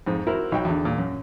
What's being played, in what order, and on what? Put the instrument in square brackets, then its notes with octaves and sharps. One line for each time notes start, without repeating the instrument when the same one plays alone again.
[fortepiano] F2 G#2
E4 F#4 A#4 C5
B1 D#4 F#4 G5
E2 D3
A#2
F#2